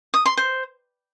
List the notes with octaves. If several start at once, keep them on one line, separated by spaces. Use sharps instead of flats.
D#6
C6
C5